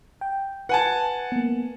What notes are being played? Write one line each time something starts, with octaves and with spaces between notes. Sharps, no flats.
G5
B4 F#5 G#5 A5
A#3 B3